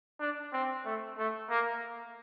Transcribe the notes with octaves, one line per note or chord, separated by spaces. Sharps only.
D4
C4
A3
A3
A#3